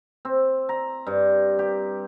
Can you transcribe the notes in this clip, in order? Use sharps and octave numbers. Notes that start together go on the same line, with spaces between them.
C4
A#5
G2
G4